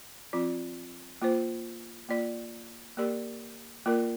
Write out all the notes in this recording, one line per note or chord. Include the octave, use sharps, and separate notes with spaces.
F3 C4 F4 D5
A#3 F4 C5
A#3 F4 D5
A#3 G4 A#4 D5
A#3 F4 A#4 D5